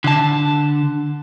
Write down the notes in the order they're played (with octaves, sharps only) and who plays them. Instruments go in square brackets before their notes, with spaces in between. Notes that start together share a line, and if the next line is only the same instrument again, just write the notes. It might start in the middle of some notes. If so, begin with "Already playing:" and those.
[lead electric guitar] D3 A5